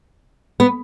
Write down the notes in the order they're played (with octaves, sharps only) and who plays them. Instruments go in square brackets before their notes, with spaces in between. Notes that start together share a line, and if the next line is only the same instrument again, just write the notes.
[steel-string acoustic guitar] B3